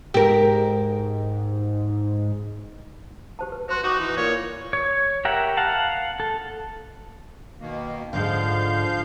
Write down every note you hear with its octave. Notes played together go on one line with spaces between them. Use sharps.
G#2 G4 A#4
G4 C5 A5
B4
F#4 C5 C6
D#4 F#4 G5 D6
E3
A#2 C#5
C#5
G4 A#4 E5 F#5 A#5
F5 F#5 A5
A4
B2 D#3 A#3
G#2 D3 F3 F5 G6